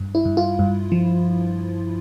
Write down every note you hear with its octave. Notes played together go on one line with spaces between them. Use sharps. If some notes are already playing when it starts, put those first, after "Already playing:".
Already playing: G2
E4
G2
F4
G2
F3